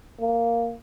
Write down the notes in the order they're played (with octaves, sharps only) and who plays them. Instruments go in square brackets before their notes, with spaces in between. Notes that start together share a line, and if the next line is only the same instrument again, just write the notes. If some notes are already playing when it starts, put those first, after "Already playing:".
[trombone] A#3